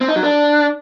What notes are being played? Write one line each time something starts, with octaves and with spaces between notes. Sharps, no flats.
C4
D#4
F#3
D4